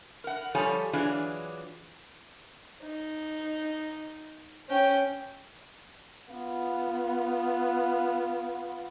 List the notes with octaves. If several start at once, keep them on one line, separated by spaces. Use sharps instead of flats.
A#4 F#5
F3 G3 F4 A4 C#5 G#5
E3 F#3 D4 F4 G#4
D#4
C#4 G5
B3 F4